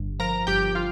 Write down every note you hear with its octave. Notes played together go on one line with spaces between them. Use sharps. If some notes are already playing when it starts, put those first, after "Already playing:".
Already playing: G1 G2
F3 A#4 A#5
G1 G4 G5
F4 F5